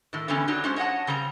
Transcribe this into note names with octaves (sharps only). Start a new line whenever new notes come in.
A2 D#3
D3 E3 G3 B3 C#4 G4
F#3 D4 D#4 G4
G#3 C#4 C5
C#5 D#5 E5 F#5 A5
C#3 G3 C4 A#5